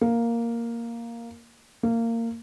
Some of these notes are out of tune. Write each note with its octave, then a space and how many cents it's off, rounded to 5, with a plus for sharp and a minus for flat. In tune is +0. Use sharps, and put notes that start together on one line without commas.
A#3 +0
A#3 -20